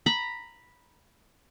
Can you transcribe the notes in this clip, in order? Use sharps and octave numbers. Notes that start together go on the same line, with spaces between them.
A#5 B5